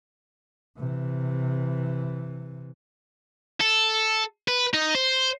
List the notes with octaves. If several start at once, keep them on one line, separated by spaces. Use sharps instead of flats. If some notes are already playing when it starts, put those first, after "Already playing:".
C3 E3
A4
B4
D#4
C5